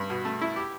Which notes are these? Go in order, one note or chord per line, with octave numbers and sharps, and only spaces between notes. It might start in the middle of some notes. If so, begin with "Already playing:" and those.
Already playing: G2
B2
A3
E4
G4